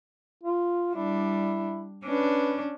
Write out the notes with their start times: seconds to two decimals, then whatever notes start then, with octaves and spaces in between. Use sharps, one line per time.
0.43 F4
0.95 G3 D4 E4
2.04 C#4 D4 B4